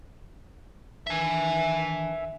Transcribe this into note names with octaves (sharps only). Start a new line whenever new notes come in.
D#3 E3 D4 E5 G#5